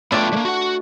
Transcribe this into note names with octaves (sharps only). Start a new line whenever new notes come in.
A3 B3 D4 E4 F4 G5
G3 A#3
F#4 F#5